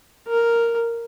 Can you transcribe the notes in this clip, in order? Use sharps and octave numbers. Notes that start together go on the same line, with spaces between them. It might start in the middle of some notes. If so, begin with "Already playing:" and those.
A#4